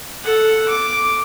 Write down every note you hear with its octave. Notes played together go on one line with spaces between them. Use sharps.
A4 F#5
D6